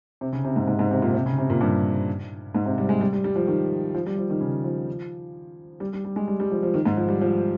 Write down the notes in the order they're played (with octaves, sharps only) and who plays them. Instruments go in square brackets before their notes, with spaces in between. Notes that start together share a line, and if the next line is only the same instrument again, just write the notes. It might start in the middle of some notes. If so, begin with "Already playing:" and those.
[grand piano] C3
C#3
C3
G#2
G#2
G#2
C3
A#2
C3
C#3
C3
A#2
G2
G#2
C3
G3
G#3
G3
G3
G3
F3
D#3
F3
G3
F3
D#3
C#3
F3
G3
G3
G3
G#3
G3
G3
F3
F3
D#3
G#2
F3
G3
F3